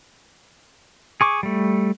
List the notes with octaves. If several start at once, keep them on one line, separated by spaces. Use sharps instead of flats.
G#4 C#6 D6
G3 A3